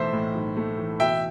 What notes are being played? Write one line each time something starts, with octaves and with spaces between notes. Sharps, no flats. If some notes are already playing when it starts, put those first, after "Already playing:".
Already playing: B1 A2 E3 A3 C5 E5
A2
B1
A3
E3
B2 E5 G5